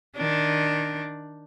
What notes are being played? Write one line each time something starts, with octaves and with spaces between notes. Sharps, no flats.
D#3 D4